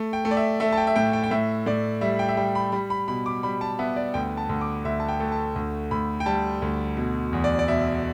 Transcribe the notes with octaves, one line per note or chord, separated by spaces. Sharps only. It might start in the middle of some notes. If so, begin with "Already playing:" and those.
Already playing: A3
G5
A3
D5
E5
A3 E5
A5
G5
E5
A2 G5
G5
G5
A2 E5
A2 D5
G3 E5
G5
E5
G3 G5
B5
G3 B5
B5
B2 B5
D6
G3 B5
A5
B3 E5
D5
D2 G5
A5
D2
D6
D2 E5
A5
G5
A3
A5
D2
D2 B5
G5
G3 A5
D2
B2
E2
D5
D5
B2 E5